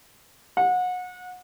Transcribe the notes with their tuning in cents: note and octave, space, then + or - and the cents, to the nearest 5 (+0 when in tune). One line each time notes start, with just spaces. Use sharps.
F#5 -30